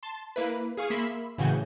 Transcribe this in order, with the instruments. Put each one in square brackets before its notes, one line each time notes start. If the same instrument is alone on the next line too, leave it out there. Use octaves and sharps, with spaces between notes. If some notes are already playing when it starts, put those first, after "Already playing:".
[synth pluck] A5 C6
A#3 E4 B4
G#4 F5 C#6 D#6
A#3 E5 B5 C6
A2 C#3 E3 F#4 G#5 G6